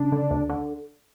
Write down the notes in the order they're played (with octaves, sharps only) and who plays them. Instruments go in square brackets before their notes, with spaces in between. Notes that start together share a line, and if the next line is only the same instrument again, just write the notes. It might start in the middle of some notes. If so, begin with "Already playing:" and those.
Already playing: [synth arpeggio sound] C#3 D4
D3
D2
D3